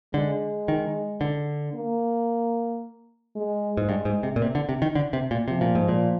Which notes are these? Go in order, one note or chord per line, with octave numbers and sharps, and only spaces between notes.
D3 G#3
D#3
D3
A#3
G#3
G#2
G2 G#3
G#2
C3
A#2
C3
D3
C3
D#3
D3
C3
A#2
C3 F3
A#2
G#2
A#2